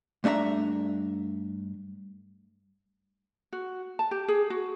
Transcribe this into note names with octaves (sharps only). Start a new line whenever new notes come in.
G2 A3 D4 E5 A#5
F#4
A5
G4
G#4
F#4